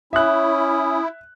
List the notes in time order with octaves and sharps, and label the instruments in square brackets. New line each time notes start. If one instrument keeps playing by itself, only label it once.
[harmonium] C#4 [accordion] E4 [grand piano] E5 F#6 [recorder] D#6